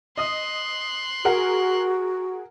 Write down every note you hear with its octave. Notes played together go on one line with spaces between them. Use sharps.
D#5 C6 D#6 F#6
F#4 G#4 A#4 F#5